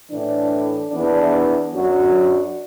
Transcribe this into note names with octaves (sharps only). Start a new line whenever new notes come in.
A2 E3 D4
E2 E3 B3 D4
F#2 F#3 D4 F#4